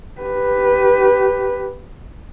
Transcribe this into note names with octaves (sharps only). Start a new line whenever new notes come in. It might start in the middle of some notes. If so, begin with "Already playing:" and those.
G4 B4